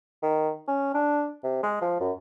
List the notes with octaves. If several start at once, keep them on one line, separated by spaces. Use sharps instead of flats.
D#3
C#4
D4
C3
G#3
F3
F#2